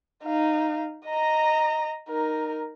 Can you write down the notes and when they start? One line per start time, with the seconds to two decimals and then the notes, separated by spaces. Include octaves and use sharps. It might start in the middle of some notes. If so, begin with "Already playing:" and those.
0.24 D#4 F5
1.06 D#5 A#5
2.09 D#4 A#4